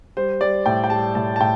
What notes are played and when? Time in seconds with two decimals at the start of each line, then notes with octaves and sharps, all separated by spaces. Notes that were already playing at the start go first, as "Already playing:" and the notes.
0.17 G3 C5
0.41 G3 D5
0.66 A2 G5
0.84 G5
0.90 G3 A5
1.15 A2 A5
1.36 A5
1.40 A2 G5